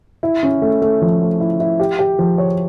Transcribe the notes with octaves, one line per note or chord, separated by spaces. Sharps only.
E4
C#4
A3
A3
F3
A3
E4
E4
G4
G4
F3
C#5